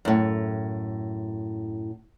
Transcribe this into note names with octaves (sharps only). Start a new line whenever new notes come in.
F#2 A2